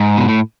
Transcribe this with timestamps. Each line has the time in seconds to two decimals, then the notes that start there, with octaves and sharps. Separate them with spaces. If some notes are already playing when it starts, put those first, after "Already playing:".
Already playing: G#2
0.18 B2
0.29 A2